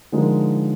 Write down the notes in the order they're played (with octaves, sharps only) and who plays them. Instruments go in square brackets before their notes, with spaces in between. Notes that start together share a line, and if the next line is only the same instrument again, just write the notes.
[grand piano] D3 F3 G#3 D#4 A#4